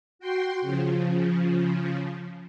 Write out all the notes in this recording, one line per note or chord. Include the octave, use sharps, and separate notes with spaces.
F#4 G5 C6
C#3 F3